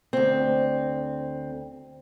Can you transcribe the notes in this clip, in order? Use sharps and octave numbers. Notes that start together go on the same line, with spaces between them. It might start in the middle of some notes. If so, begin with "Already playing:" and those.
D2 C4